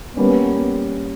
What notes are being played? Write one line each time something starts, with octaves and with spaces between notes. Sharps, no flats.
G3 A#3 B3 C#4